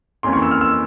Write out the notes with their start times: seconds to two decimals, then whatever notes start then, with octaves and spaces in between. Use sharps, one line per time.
0.23 F2 E3 A#3 C#4 C6
0.33 C#6
0.42 E6
0.51 F6
0.61 E6